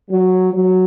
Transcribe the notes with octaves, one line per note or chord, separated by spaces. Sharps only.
F#3
F#3